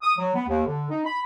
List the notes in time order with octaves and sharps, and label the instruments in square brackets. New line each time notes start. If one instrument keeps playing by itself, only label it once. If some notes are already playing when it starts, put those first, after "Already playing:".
[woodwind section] D#6
F#3
B3
D#2
D3
D#4
B5